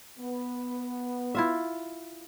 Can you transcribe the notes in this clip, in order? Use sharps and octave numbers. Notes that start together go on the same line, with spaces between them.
B3
E4 F4 E5